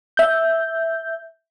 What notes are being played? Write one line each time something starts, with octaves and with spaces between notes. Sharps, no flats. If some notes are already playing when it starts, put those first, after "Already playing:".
E5 G6